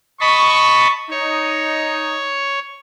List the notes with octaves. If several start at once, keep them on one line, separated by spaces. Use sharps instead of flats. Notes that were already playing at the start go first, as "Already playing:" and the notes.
D#5 A5 B5 C#6
D#4 C#5